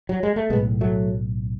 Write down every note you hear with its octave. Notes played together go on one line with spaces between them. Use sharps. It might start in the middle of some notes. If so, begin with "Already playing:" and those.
F#3
G#3
A3
B1 A2 G#3 B3
F#3 A3